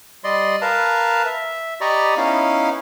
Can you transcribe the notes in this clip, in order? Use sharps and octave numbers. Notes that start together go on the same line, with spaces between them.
G3 D5 D#5 C6
A#4 B4 F5 A5 A#5
E5
G4 D5 D#5 A#5 B5 C#6
B3 C#4 D#4 E4 F5